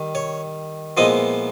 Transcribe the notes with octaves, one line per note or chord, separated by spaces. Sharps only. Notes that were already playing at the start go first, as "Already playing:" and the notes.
Already playing: D#3 G3
C#5
A#2 F3 G#3 B3 E4 D#5